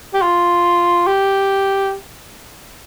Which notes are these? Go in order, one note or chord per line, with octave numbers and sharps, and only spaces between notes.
G4
F4
G4